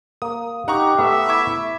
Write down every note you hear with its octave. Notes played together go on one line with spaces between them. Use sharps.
A#3 D#6
D#4 G4 F#5 A#5 C#6
A3 B3 E5
E4 C#6 D6 G#6